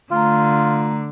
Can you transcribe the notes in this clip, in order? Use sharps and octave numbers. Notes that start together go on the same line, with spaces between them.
D3 A3 F4 A#5